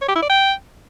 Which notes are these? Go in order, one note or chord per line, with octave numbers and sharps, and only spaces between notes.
C#5
G4
E4
D5
G5